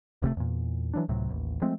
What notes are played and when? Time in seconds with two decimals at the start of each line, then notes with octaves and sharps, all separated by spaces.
0.22 D1 C3 G3 A3
0.37 E2 A#2
0.94 E3 F#3 D4
1.08 C#2 A2 C3 F#3
1.29 A1 D#2
1.62 F3 G#3 A3 C4